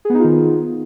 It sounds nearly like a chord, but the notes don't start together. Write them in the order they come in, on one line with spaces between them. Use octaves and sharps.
G#4 B3 D#4 F4 D#3